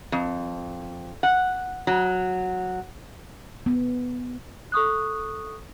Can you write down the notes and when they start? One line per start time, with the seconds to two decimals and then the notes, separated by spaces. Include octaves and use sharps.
0.12 F2
1.23 F#5
1.87 F#3
3.66 B3
4.72 A4 C#6 D#6 F#6